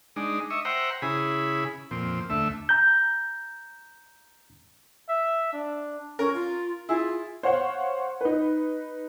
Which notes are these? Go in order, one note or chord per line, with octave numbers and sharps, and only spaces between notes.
G#3 D4 D#4
D#5 E5 C#6
C5 E5 F#5 G5 A#5
C#3 E4 G#4 B5
F2 A#2 C4
D2 A3 E5
A#5 G6
E5
D4
C#4 A#4
F4
E4 F4 G#4
C5 C#5 F5 F#5
D#4 B4